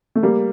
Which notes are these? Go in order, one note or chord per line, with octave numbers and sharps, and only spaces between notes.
A3
G3 A#3